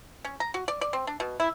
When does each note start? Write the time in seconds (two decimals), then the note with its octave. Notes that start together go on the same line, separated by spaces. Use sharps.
0.25 C#4
0.40 A#5
0.54 F#4
0.68 D5
0.81 D5
0.93 C4
1.07 D4
1.20 B2
1.40 E4